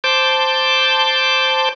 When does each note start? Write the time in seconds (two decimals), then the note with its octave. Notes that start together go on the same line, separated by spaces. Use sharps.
0.04 C5 A5 D6 G6